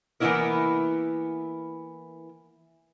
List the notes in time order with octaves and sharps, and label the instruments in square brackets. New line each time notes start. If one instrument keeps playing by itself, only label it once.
[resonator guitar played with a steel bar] E3 A#3 B3 C#4 E4 A#4